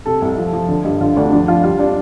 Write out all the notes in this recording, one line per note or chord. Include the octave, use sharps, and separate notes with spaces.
C3 A4
C2
F3
F3
D3
G2
D3 F4
D2 D4
F3 D4
F3 F4
G3 F4
G3 D4